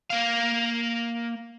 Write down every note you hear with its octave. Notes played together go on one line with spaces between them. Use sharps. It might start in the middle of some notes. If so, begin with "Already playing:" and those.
A#3 F5